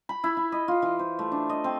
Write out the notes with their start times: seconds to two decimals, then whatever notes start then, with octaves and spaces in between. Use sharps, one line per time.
0.09 B5
0.24 E4
0.37 E4
0.52 D#5
0.68 F4
0.82 E3
0.99 C5
1.19 A3
1.32 D4
1.49 D#5
1.64 C4